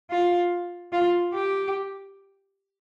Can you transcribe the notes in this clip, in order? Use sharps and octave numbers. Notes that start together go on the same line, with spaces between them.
F4
F4
G4